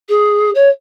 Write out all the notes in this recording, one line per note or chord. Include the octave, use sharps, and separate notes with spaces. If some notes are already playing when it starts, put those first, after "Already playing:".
G#4
C#5